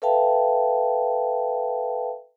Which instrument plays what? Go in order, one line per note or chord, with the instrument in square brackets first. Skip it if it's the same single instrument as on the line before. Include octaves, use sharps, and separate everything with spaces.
[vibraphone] A4 B4 E5 F5 G5 A5